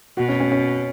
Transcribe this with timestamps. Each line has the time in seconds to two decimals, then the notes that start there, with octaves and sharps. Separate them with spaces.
0.17 B2 F#4
0.29 C#4
0.40 C#4
0.52 C#4